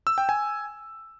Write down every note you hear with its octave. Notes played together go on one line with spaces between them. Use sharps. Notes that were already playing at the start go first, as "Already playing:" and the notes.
E6
G5
G#5